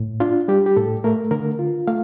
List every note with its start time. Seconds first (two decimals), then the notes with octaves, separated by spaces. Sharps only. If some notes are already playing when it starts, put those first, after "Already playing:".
Already playing: A2
0.20 D4 F4
0.48 G3 G4
0.66 G4
0.76 A2 A4
1.04 A3 A#4
1.31 D3 A#4
1.59 F4
1.87 A3 F5